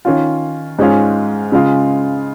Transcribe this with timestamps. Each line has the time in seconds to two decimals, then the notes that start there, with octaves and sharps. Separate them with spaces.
0.05 D#3 C#4 F4
0.79 G#2 G#3 C#4 F4
1.52 C#3 G#3 F4